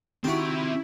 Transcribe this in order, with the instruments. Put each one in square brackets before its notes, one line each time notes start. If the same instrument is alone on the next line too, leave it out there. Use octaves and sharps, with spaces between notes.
[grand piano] D#3 [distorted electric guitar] C4 E5 [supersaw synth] E4 [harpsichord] F#4 G4